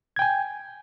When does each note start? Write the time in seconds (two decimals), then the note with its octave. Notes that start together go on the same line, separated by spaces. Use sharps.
0.16 G#6
0.19 G5
0.22 G#5